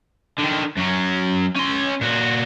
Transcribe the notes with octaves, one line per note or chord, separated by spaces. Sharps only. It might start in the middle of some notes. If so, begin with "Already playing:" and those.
D3 D#3
F#2 F#3
C#4 C6
A#2 F#4